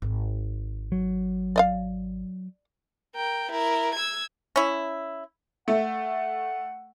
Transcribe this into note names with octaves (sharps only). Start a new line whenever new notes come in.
G#1
F#3
D5 D#5 F5
A#4 G5
E4 A#4
E6 G#6
C#4 E4
A3 F#5